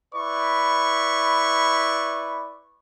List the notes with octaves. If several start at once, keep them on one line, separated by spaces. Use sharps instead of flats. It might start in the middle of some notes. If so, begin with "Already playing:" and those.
E4 B4 D5 C#6